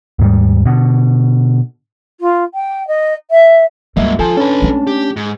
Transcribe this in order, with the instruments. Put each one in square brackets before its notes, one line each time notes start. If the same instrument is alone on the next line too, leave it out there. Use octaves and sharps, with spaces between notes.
[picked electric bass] D#2 G#2 G3
B2 D3
[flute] F4
G5
D#5
E5
[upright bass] C#2 G2 [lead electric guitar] F#3 A#3 [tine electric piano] D#5 E5
[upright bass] D3 [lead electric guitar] F3 [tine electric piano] A4 G#5 A5
[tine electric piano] C#4 D4 A5 [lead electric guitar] A4 B4
[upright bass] A3 C4
[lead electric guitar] G4
G#2